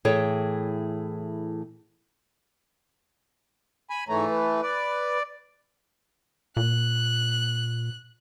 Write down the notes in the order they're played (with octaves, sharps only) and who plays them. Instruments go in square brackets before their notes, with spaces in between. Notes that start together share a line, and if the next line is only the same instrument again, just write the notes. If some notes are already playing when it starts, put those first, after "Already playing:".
[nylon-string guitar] A2 E3 G#4 A4 C#5 G5
[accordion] G#5 B5
[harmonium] G#2 C#5 A#5 [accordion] E3 A3
[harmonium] B4
[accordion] D5
[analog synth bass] A#2 [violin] F#6